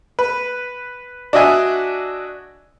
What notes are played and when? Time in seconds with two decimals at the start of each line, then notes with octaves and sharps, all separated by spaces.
0.19 B4
1.33 D4 F#4 D#5 E5 G#5